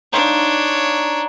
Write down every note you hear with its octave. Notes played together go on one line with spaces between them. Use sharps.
D4 D#4 C5 C#5 F5